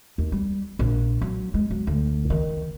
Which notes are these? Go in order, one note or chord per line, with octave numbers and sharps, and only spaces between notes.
D#2
G3
A#1
F#3
G#3
F#3
D2
D#3